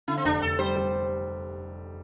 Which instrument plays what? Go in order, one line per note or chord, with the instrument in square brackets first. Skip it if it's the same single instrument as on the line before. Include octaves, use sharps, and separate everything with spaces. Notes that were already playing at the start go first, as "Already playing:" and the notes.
[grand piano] D3 [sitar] E4
[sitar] C4
[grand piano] F1 [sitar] D4
[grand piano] F1 [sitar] A4
[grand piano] G3 [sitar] C5
[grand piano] G3